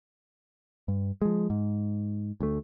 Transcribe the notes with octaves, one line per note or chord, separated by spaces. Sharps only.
G2
F3 G#3
G#2
D2 A3